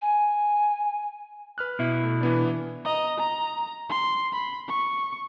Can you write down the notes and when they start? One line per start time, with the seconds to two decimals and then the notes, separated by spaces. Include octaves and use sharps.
0.01 G#5
1.58 B4 F6 F#6
1.79 B2 E4
2.03 A3
2.21 E3 B3 D4
2.85 D#5 A#5
3.18 A#5
3.90 C6
4.33 B5
4.68 C#6